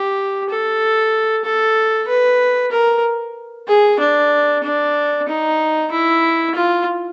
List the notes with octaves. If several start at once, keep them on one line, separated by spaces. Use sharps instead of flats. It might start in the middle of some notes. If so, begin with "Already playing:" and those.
Already playing: G4
A4
A4
B4
A#4
G#4
D4
D4
D#4
E4
F4